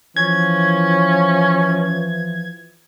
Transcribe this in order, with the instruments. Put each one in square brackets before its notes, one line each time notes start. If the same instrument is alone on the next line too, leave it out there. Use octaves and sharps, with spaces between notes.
[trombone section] E3 F3 [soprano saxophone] C#4 [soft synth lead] G#6